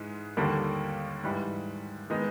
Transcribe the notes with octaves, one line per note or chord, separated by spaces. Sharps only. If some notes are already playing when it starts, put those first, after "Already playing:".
Already playing: G#2 E3 G#3
D#2 D3 G3 A#3
G#2 E3 G3
D#3 G#3 B3 D#4